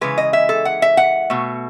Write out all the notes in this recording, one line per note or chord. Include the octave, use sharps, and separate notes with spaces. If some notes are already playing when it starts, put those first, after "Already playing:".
C#3 E3 G#3 B4
D#5
E5
A4
F#5
E5
F#5
B2 A3